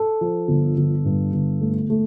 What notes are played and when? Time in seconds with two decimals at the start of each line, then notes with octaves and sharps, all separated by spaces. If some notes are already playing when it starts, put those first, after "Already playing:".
Already playing: A4
0.21 F3
0.48 G1
0.77 G1
1.05 G2
1.33 G1
1.61 A3
1.90 A3